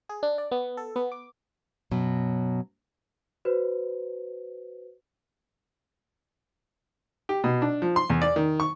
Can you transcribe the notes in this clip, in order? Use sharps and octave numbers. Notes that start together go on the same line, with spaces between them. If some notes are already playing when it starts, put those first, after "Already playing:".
G#4
D4
D5
B3
A4
B3
D6
F#2 B2 F#3
F#4 B4 C5
G4
B2
D4
F3
C6
E2
D5
D#3
C#6